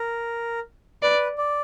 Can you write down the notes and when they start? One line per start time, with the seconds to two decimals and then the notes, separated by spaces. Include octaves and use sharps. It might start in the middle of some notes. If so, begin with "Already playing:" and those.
Already playing: A#4
1.02 B4 D5
1.38 D5